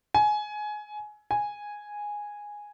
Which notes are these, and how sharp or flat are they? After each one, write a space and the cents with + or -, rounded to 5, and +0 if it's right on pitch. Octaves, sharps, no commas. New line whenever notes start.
G#5 +20
G#5 -5